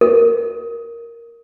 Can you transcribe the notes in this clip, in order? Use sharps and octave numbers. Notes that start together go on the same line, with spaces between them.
A#4